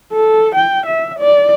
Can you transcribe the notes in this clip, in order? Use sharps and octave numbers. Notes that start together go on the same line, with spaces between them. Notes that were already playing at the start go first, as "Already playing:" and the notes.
A4
G5
E5
D5